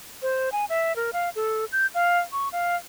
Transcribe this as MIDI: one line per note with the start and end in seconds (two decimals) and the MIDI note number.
0.22 0.50 72
0.52 0.65 80
0.69 0.95 76
0.96 1.11 70
1.13 1.30 77
1.36 1.65 69
1.72 1.86 91
1.94 2.19 77
2.33 2.49 85
2.52 2.76 77